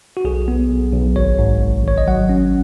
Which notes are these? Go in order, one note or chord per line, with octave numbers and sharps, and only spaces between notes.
F#4
B1 G#4
B3
B1
B1
G#1 C#5
G#2
G#1
G#1 C#5
D#5
F#3 F#5
C#4